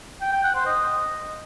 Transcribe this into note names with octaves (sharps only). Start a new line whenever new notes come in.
G5
G5
F#5
C5
D#5